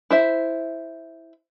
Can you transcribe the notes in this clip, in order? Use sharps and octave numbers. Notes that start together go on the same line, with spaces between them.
E4 C5 E5